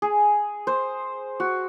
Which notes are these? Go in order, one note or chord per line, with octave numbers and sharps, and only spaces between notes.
G#4
C5
F#4